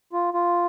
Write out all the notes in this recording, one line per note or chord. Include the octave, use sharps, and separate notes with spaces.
F4
F4